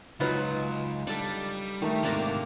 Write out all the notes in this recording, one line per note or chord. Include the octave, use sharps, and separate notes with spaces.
C#2 F#3 D#4 F4 B4 B5
G3 D4 A4
D#3 G3 A3 G4
G#2 C3 A#3 D4 A#4